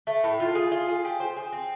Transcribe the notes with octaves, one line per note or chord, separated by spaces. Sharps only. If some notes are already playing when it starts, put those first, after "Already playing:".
A3
A2
F4
G#4
F4
G#4
G4
C5
G#4
C4